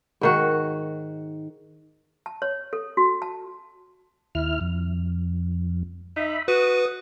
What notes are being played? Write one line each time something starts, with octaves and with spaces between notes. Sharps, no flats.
G#2 D#3 F#4
A5
C#5
A4
F#4
A5
D#2 E4 F6
F2
D#4 E5 B5
F#4 B4 D#6